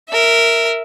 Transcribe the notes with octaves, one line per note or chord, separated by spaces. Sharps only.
A#4 E5